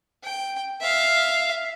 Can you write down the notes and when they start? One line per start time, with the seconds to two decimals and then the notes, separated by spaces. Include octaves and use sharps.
0.24 G5
0.81 E5 F5